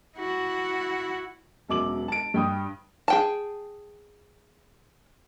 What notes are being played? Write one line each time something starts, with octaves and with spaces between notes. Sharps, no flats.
E4 F#4
E1 F#2 D6 F#7
A5 D7
G2 G5 D#6
G#4 G5 A5